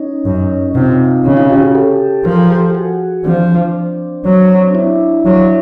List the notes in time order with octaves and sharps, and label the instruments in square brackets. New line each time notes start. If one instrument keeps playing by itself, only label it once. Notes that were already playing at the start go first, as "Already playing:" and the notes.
Already playing: [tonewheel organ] C#4 D#4
[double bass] F#2
[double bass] C3 [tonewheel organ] D#4 F4
[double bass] C#3
[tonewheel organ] D#4 F4
F4 G4
F#4 G#4
G4 A4
[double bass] F3 [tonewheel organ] G#4 A#4
[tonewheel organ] G4 A4
G4
F#4 G#4
[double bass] F3 [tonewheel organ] C4 D4
[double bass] F#3
[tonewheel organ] D4 E4
[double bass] F#3